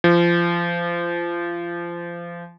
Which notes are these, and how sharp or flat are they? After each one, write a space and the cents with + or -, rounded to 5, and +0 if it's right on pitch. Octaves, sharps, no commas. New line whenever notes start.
F3 -25